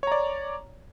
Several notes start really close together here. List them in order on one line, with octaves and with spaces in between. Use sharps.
C#5 A#5 D5